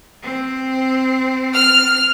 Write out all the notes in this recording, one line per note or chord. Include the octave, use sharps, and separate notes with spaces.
C4
F6